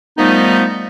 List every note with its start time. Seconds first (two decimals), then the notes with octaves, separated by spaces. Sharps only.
0.18 D#3 F3 G3 A3 B3 D#4